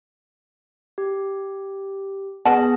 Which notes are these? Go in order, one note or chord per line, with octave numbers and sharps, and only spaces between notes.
G4
B3 G#4 B4 F#5 A5 A#6